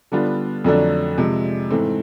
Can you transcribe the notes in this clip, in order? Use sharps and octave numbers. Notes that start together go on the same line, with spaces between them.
D3 G3 B3 D4 F4
F2 D3 F#3 A3 D4
C3 F3 G#3
G#2 E3 A3 C4